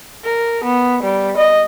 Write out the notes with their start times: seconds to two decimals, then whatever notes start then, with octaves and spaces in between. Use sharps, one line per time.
0.24 A#4
0.64 B3
1.03 G3
1.37 D#5